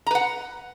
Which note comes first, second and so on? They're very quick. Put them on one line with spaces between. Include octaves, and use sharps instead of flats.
A#5 B4 F#5